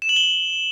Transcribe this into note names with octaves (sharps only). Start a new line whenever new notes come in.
E7
F#7
G7
F#7